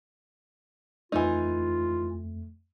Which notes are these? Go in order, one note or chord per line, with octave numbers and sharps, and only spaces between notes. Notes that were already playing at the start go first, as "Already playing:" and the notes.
F2 E3 A3 D#4 F4